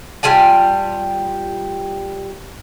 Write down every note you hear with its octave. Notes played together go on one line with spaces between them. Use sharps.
G3 F4 G#5 A5